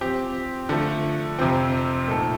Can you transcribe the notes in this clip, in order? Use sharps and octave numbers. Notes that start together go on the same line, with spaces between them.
F3 C4 G4
D3 F3 A3
F2 C3 F3 C4
A#2 A3 D#4 A4